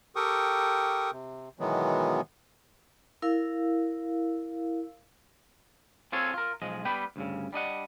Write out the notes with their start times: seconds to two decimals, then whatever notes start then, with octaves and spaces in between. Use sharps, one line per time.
0.16 G4 A4 A#4 G5 C#6 D#6
1.12 C3
1.59 B2 D#3 E3 F#3 G#3 B3
3.22 E4 A#4 F5 E6
6.12 C4 F4 G#4 A4 C#5
6.34 F4 A#4
6.62 B1 F3 G#3 D#5
6.85 G3 B3 B4 G5
7.16 D2 G2 C#3
7.53 G3 D4 D#5 F#5